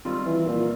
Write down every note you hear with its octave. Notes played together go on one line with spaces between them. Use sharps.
D#3 G3 C4 F4
E3
A#2